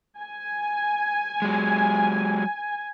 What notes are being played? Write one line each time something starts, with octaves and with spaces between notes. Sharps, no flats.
G#5
F#3 G#3